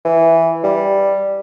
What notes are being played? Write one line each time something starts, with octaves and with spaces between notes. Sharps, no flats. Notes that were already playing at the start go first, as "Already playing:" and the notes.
E3
G3